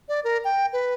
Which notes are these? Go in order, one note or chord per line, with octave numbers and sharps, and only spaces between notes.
D5
A#4
G5
B4